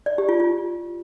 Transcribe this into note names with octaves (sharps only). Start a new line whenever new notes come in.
D5
G4
F4
F4